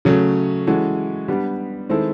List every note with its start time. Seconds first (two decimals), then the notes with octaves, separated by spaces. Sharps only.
0.05 C#3 F#3 A3 C#4
0.67 E3 G#3 C#4 F#4 A4
1.28 G3 B3 D4 G4
1.89 D#3 G#3 C4 E4 A4